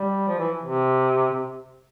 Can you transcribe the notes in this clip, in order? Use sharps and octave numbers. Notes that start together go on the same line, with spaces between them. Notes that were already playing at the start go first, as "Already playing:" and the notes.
Already playing: G3
F3
E3
C3
C3